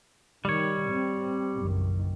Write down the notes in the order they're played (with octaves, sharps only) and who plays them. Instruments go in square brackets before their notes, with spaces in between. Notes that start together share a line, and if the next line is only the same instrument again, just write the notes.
[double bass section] D#3 [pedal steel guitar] G3 C#5
[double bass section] C4
F#1 B1 D#3